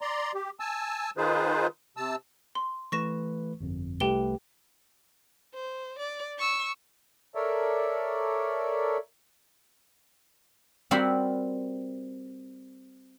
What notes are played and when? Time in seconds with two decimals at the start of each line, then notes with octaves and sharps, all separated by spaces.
0.01 D5 A#5 C6
0.35 G4
0.60 G#5 A5 E6
1.17 D#3 D#4 F4 G#4 B4 C5
1.97 C3 A5 E6
2.55 C6
2.92 E3 A3 B4 C#6 A#6 E7
3.61 G1 F2
4.00 C2 A3 G4 B4 G5 G7
5.54 C5
5.99 D5
6.38 C#6 E6
7.35 A4 A#4 C#5 D5 E5
10.91 G3 C4 F#4 A#4 F#5 B5